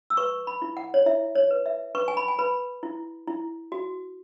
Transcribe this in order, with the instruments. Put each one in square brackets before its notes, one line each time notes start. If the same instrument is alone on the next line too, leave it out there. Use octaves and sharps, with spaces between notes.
[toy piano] E6
B4 C#6
B5
E4
F#5
C#5
E4 E5
C#5
B4
E5
B4 C#6
G#5
B5
G#5
B4 B5
E4
E4
F#4